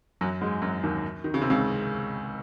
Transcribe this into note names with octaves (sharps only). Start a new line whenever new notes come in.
F#2 F#3
G#2 G#3
F#2 F#3
D#2 D#3
D#3
C#3
C3
C#2 C#3